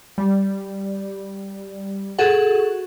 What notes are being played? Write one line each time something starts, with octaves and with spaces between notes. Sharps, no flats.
G3
F#4 G#4 A4 F#5